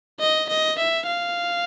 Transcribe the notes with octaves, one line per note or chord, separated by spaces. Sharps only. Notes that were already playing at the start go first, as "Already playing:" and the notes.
D#5
D#5
E5
F5